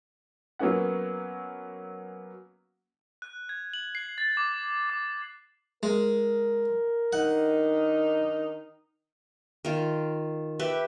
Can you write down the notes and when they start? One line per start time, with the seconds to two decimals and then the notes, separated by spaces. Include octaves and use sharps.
0.59 F#3 A#3 B3 C#4 F#5
3.22 F#6
3.49 G#6
3.73 F#7
3.95 C7
4.18 A6
4.37 D6
4.90 D6
5.83 G#3 A#4
7.13 D#3 D4 D#4 F#5
9.65 D#3 F4
10.59 G4 B4 E5